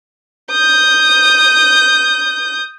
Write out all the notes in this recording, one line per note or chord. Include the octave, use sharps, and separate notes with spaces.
D#6 G6